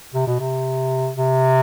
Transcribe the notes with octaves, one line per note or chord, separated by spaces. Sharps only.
C3
B2
C3
C3